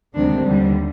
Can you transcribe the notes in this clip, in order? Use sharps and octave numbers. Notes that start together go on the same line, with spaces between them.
D2 C3 D#3 G#3 D4
D#2 D3 G3